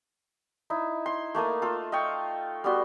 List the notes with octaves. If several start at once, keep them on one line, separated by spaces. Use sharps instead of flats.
D#4 E4
C6
A3 A#3 A5 D#6
F4 A4
D#5 F5 G5 C#6
G3 B3 F#4 C6